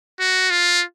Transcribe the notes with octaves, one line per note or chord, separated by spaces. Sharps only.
F#4
F4